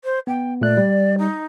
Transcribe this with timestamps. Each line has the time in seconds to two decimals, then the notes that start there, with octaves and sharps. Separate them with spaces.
0.04 C5
0.27 B3 G5
0.61 A#2 A3 D5 F#6
0.77 G3
1.18 D#4